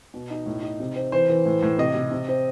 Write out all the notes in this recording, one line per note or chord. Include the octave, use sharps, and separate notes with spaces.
B2
D#4
A2
D#4
C3
C4
E3 C5
E3
A2
A2
C3 D#5
C3
C3
C4